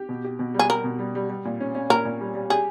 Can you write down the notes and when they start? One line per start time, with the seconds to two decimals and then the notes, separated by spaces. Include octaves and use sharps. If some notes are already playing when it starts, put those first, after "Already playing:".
Already playing: G4
0.09 B2
0.24 G4
0.39 B2
0.54 G3
0.59 G#4
0.69 G3 A#4
0.84 B2
0.99 G3
1.15 G3
1.30 G3
1.45 A#2
1.60 C#4
1.75 C#4
1.90 A#2 A#4
2.05 A#2
2.21 G3
2.35 G3
2.50 G4 G#4